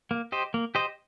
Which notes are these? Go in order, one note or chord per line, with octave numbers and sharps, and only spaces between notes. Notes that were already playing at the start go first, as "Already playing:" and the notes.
A#3
G4 C5 D#5
A#3
G4 C5 D#5